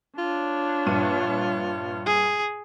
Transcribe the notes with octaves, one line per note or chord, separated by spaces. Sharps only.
D4 F4 C#5
A#1 G2 D#7
G#4